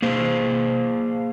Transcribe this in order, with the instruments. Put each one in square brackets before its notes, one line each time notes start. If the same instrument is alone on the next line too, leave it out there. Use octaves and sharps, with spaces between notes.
[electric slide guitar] A#3 G#4 C5